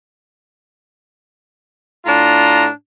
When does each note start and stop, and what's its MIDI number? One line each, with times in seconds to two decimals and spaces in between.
2.06 2.67 45
2.06 2.67 62
2.06 2.67 65
2.06 2.67 82